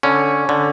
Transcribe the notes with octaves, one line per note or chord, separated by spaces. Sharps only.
D3 C#4
D3